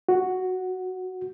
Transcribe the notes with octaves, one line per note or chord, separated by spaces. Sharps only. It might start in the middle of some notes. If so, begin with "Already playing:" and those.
F#4